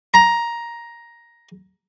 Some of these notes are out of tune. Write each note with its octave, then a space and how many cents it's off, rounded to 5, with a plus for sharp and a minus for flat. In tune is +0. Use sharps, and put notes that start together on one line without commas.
A#5 +10